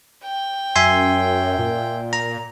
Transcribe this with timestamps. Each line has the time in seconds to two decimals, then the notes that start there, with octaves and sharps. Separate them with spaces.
0.24 G5
0.76 F#2 E5 G#5 C6
1.58 A#2
2.13 A#5